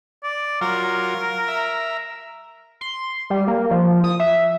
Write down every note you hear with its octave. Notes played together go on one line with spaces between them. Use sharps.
D5
F#3 F4 A#4
E5 A#5
C6
G3
A#3
F3
D#6
E5